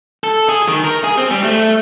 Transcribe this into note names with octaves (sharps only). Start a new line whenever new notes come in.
A4
G#4
D#3
A#4
G#4
C4
G3
A3